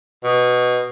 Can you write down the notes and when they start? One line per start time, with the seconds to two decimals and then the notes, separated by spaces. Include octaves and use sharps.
0.24 B2